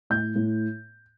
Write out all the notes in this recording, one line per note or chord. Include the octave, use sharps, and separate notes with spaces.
A2 G6
A2